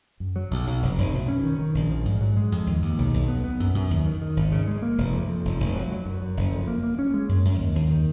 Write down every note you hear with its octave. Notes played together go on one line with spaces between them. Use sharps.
F#2
F#3
B1
B1
F1
F1
B2
C#4
D#3
D#3
A#1
F3
G#2
F#3
G#3
F2
D#2
D#2
B1
B1
B3
B3
F#2
F#2
D#2
D#3
D#3
G#1
C#3
G#3
A#3
F1
F2
F2
F1
F1
F#3
F#3
F#2
F#2
F#1
F2
A#3
A#3
C#4
G#3
F#2
F#2
D#2
D#2
D#3